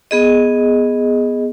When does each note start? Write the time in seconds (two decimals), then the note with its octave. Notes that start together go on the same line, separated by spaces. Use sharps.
0.11 B3 G#4 D#5